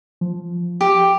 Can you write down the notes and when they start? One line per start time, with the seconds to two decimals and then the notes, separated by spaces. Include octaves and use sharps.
0.21 F3
0.81 G4